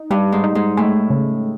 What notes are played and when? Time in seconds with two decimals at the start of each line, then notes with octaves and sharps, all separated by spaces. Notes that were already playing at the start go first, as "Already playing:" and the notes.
Already playing: D#4
0.10 G2 G3
0.32 G#2
0.44 D#4
0.55 G#2
0.77 A2 G#3
1.10 C#3